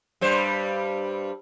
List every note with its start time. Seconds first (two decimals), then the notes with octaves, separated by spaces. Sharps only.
0.21 G2 G3 C5